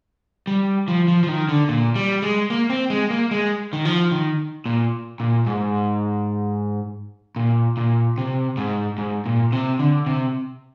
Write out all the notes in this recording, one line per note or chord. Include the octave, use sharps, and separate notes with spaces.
G3
F3
F3
F3
D#3
D3
A#2
G3
G#3
A#3
C4
G#3
A#3
G#3
D#3
F3
D#3
A#2
A#2
G#2
A#2
A#2
C3
G#2
G#2
A#2
C3
D3
C3